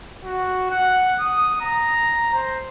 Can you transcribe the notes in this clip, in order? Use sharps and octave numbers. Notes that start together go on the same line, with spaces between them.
F#4
F#5
D#6
A#5
C5